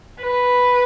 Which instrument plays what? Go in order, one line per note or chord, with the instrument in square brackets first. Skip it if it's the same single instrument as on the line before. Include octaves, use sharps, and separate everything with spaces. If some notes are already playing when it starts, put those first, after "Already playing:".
[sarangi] B4